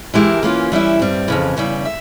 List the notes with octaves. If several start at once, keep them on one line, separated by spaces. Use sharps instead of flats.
E3 G#3 E4 G4 A#4
E3 A#3 C#4 F4
E3 G3 C#4 E4
G2 G3 C4
F2 C#3 E3
E2 C#3 G3
E5